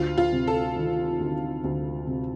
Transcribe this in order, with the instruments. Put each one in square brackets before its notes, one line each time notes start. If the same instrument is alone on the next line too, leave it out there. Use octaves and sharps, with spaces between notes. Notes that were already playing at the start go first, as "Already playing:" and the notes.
Already playing: [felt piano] D2 [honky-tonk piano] F4
[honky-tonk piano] F4
[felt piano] C3
[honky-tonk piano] A4
[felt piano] D#3
D2
D2
C3